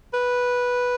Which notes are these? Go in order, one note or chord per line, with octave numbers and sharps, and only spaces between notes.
B4